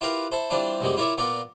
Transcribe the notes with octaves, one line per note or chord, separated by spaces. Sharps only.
E4 F4 G4 A#4 B4 F5
E4 A4 C5
E3 G3 C4 D4 E4 F4
C#2 F#2 C3 G3 G#3 A#3
E4 F4 A#4 C#5 D5 E5
A#2 B3 F4 A#4 D5